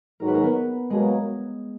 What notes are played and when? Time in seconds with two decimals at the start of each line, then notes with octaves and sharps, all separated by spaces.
0.20 G#2 D#3 F#3 A#4
0.28 B4
0.34 A#3 A#4
0.43 B3 B4
0.90 B2 F#3 G#3 A#3 G#4